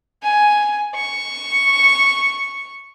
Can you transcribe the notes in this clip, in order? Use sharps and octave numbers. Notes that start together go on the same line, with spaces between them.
G#5
C#6